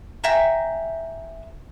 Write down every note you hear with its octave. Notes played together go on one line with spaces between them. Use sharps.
E5 G5 G#5 A#5